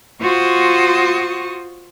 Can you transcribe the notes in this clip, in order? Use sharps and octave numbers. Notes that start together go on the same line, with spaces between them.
F4 F#4 C5 C#6 D#6